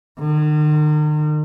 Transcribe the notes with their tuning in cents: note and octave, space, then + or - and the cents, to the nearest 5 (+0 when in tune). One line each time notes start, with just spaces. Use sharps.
D#3 -45